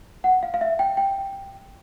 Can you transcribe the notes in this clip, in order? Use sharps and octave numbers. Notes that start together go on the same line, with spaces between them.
F#5
F5
F5
E5
G5
G5